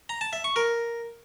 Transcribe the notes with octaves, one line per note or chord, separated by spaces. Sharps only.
A#5
A5
E5
C#6
A#4